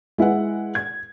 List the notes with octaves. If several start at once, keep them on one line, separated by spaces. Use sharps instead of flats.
G#3 E4 B4 F#5
G#6